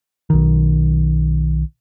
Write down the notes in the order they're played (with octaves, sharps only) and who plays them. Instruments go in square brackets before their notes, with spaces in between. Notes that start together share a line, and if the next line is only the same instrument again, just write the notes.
[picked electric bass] B1 D#3